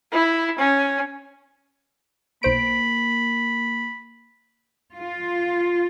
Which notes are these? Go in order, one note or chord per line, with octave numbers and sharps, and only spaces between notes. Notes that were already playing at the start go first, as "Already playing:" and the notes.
E4
C#4
B1 A#3 C5 B5 D7
F4